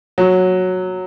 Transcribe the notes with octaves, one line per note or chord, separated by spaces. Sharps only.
F#3